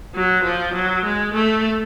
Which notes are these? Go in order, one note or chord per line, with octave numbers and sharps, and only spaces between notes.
F#3
F3
F#3
G#3
A3